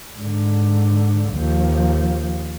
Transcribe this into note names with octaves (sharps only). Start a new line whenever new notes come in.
G#2 D3
D#2 F3